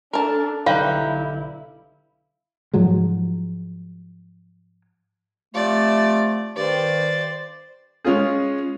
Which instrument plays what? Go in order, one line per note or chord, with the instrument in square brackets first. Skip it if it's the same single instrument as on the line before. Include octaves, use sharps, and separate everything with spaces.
[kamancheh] D4 A4 [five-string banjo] A#4 A5
[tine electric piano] B1 D3 [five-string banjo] G3 D#4 B4 [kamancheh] E4 [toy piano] F5
[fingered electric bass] G#2 F3 F#3 G#3
[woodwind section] C3 F3 A3 [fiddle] D5
[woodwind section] G2 D#3 [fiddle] C5 D5
[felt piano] G#3 C#4 F4 G#4